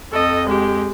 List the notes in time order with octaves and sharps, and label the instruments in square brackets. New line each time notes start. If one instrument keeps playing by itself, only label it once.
[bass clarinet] F2 [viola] A4 D#5
[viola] G#3 G4